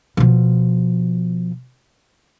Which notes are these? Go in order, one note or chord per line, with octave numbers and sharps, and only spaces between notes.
B2 F3